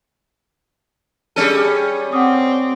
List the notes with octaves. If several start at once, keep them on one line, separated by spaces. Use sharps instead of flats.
G3 C#4 G#4 A4 F6 D#7
C4 F#5 D6 D#6